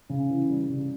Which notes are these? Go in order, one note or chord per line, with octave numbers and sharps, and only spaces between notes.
C#3
E3
G3
C#3